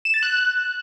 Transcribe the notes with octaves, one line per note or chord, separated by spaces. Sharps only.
E7
A6
F#6